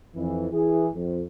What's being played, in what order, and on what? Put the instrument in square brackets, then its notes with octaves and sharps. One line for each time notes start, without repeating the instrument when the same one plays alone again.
[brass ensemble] F2 E3
E3 G#4
F2